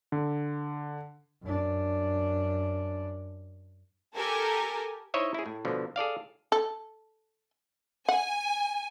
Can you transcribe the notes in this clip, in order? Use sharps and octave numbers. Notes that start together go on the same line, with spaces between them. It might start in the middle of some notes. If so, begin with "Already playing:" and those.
D3
F#2 D4
G4 A4 A#4 G#5
D#4 E4 C5 C#5 D#5 E5
E4 G#4
A2
B2 D3 F3
G#4 A4 D5 F5
A4
F#5 G#5